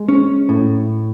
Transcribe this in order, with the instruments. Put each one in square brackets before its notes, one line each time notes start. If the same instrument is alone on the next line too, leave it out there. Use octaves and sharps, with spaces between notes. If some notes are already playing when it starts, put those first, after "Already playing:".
Already playing: [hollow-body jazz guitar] G#3
C#4
A2